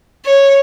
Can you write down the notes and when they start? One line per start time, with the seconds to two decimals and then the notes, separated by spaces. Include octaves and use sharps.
0.25 C#5